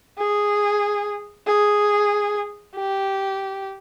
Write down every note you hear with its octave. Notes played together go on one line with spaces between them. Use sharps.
G#4
G#4
G4